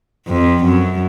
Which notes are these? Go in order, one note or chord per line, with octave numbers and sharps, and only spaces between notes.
F2
F#2